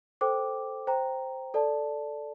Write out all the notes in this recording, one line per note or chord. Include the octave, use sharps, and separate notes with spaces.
A4 C5 G5 D6
C5 G5 A#5
A4 D5 A5